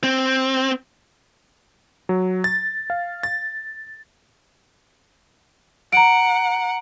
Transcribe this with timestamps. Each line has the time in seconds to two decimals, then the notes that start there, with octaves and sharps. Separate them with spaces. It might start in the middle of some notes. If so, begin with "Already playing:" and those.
0.04 C4
2.09 F#3
2.44 A6
2.90 F5
3.23 A6
5.93 F#5 A#5 D7